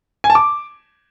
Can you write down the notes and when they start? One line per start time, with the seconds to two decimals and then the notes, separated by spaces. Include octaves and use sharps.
0.24 G#5
0.30 A5
0.35 D6